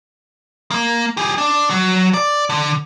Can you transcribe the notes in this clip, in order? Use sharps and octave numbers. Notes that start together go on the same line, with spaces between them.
A#3
G4 G#4
D4
F#3
D5
D3